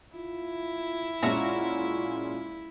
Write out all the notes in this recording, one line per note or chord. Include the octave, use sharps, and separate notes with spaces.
E4 F4
A#2 G#3 C#4 F4 F#4 E5 A#5